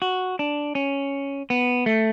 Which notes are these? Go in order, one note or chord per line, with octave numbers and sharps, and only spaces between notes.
F#4
D4
C#4
B3
A3